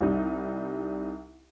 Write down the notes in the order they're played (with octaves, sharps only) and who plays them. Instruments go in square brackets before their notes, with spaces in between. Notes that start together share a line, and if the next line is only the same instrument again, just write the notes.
[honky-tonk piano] C2 G3 D#4